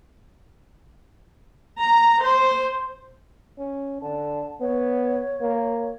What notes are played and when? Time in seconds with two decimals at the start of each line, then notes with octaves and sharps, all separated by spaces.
1.79 A#5
2.21 C5
3.58 C#4
4.02 D3 A5
4.61 B3 C#5
5.41 A#3